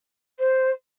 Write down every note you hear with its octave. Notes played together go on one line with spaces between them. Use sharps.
C5